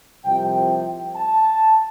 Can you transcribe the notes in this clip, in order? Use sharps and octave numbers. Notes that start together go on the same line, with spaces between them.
C2 C3 F3 G5
G5
A5